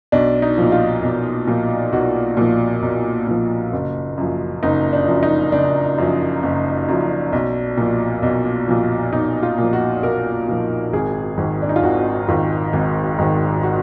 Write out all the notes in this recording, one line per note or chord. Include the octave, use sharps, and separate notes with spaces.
B1 D4
D#4
A#2 F3
F4
B1
A#2 F3
B1 F#4
A#2 F3
B1
A#2 F3
F#1
F#2 F3
F#1 D#4
D4
F#2 F3
D#4
F#1 D4
F#2 F3
F#1
F#2 F3
B1
A#2 F3
B1
A#2 F3
B1 D#4
F4
A#2 F3
F#4
B1 A#4
A#2 F3
G#1 G#4
G#2 D#3
D4
D#4
F4
G#1 F#4
G#2 D#3 F4
G#1
G#2 D#3
F#4